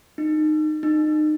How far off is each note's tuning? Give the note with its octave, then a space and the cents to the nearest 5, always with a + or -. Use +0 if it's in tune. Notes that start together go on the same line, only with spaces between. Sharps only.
D#4 -20
D#4 -30